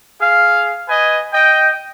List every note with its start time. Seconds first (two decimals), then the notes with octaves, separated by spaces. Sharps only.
0.20 G#4 F5
0.88 B4 D#5 G#5
1.34 D#5 G5